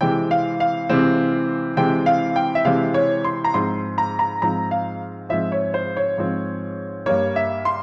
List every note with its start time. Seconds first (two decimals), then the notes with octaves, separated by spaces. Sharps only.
0.01 C3 E3 G#3 C4 G5
0.31 F5
0.60 F5
0.90 C3 E3 G#3 C4
1.77 C3 E3 G#3 C4 G5
2.06 F5
2.36 G5
2.55 E5
2.65 C3 E3 G#3 C4 F5
2.94 C#5
3.25 C6
3.44 A#5
3.54 G#2 F3 C4 C6
3.98 A#5
4.19 A#5
4.42 G#2 F3 C4 A#5
4.71 F5
5.29 G#2 F3 C4 E5
5.52 C#5
5.74 C5
5.97 C#5
6.18 G#2 F3 C4
7.06 G2 G3 A#3 C#5
7.36 E5
7.65 C6